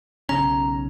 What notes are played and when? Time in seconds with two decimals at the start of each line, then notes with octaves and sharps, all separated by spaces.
0.29 B1 C#3 C#4 A#5